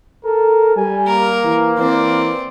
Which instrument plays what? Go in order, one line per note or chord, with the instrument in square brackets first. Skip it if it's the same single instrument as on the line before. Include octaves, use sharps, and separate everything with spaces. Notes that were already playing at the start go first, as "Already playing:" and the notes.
[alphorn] A4 [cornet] A#4
[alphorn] G3 [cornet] G#5
[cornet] A#3 [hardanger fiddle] A#4
[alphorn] E3
[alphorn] E3 [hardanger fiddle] C4 D5